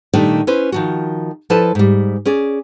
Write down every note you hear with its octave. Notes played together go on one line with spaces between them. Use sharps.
A#2 D#3 G3 A3 D4
C#4 E4 B4 C5
D#3 F3 F#4
F3 E4 A4 B4 D5 A5
G#2 G3
C#4 G#4 D5